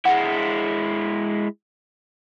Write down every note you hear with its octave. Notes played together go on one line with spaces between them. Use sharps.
G#3 E4 F#5